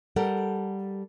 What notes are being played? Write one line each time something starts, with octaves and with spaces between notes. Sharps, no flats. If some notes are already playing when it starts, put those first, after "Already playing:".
G3 A4 A#4 F#5